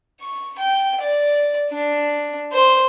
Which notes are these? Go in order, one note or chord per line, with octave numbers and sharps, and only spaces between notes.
C#6
G5
D5
D4
C5